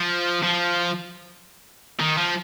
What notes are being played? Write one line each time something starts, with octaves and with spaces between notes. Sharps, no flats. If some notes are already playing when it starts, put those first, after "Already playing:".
Already playing: F3
F3
D#3
F3